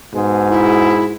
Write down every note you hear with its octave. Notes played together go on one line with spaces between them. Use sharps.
G#2 B2 G#3
E4